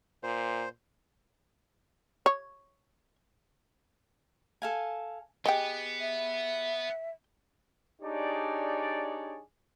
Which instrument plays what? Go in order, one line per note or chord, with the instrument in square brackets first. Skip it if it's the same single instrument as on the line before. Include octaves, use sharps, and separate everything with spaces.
[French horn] A#2 [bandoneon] C5
[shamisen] C#5
[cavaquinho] A4 F5 G#5
[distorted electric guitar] B3 [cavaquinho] G4 G#4 [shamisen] D#5 G5
[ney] E5
[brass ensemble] D4 D#4 G4 G#4 C#5 D5